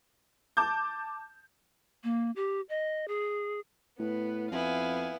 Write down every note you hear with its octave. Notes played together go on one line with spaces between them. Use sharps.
A5 D6 G6
A#3
G4
D#5
G#4
A2 B3 B4
F2 B3 E4 F5 G#5